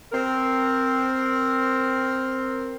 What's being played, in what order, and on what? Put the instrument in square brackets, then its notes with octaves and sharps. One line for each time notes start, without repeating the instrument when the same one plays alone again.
[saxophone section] C4 A#4